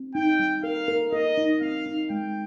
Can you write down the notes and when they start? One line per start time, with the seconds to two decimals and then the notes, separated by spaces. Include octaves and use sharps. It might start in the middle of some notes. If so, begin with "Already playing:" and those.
Already playing: C4
0.15 D#4 G5
0.39 G3
0.63 A#4 F5
0.88 A#4
1.12 A#4 D#5
1.37 D#4
1.61 C4 F5
1.86 D#4
2.10 G#3 G5